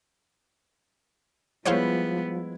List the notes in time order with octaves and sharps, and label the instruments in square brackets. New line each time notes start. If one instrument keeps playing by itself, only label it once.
[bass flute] F3 [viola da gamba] G3 B3 [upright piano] G#3 E4 [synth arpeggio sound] C5 C#5 F5